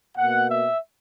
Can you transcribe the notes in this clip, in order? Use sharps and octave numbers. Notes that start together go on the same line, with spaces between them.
B2 A#3 F#5
E5